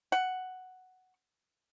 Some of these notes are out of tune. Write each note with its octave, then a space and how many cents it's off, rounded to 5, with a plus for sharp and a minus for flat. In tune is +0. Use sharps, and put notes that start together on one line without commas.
F#5 +5